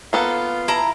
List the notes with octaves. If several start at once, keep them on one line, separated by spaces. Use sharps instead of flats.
A#3 B3 F4 A4
E4 A5 A#5